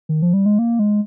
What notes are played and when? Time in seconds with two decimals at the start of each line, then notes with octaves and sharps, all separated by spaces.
0.09 D#3
0.22 F3
0.33 G3
0.46 G#3
0.59 A#3
0.79 G#3